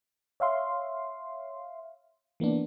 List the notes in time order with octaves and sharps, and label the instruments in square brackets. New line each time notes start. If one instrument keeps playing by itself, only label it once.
[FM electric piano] C#5 E5 F5 C6
E3 A#3 B3 D4